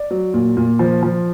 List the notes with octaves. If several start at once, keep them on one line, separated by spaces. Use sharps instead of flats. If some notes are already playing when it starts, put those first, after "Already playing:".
Already playing: D5
F#3
A#2
A#2
F3
F3